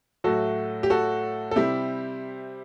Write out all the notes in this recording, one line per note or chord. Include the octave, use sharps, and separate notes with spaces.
A2 F#3 A3 F#4 A4
G4
F#4 A4
A4
C3 G3 E4 G4